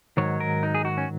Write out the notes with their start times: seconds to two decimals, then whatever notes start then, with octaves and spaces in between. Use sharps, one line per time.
0.17 G#2 D#3 F#3 C#5
0.40 A#4
0.63 D#4
0.75 G#4
0.85 F#4
0.98 C#4